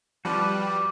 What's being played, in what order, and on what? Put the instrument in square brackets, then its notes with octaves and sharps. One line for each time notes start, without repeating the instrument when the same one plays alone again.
[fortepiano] F3 [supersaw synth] G3 [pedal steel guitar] F#4 B4 [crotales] D6